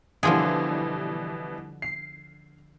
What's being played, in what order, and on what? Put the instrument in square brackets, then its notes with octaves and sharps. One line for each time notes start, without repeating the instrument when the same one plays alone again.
[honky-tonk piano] B2 E3 G3 [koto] D3 F3 G#4
[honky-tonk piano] C7